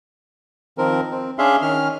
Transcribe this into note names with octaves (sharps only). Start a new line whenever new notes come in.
D#3 F3 C4 A#4
C4
C#4 D4 G#4 E5 F5 C6
D#3 C#4 F6